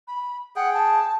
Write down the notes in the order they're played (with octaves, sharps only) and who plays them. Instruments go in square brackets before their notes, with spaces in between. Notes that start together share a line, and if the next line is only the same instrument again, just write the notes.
[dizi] B5
[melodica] G#4 G5 [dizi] F#5
[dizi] A5